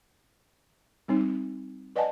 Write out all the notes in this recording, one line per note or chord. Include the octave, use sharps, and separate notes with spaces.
G3 C4 D#4
B4 D5 D#5 F#5 G#5 A5